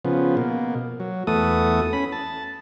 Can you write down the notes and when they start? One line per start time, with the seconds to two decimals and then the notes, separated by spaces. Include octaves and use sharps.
0.05 C#3 F3 B3
0.37 B2 A#3
1.00 F#3
1.27 E2 A3 B3 F#4 A4 D#6
1.93 C#4 B5
2.12 A5